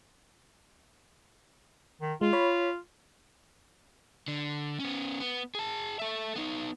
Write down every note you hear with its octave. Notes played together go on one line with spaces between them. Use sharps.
D#3
G#3 F4
C#5 B5
D3
B3 C#4
B3
G#4 A5
A4 E5
B3 D#4